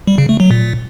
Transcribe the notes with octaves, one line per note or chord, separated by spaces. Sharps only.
G3
C#3
A3
F#3
A#2